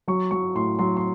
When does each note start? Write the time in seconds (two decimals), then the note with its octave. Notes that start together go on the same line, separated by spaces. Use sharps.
0.08 F#3 C#6
0.31 F#3 C#6
0.55 A2 C6
0.79 F#3 C6
0.97 C6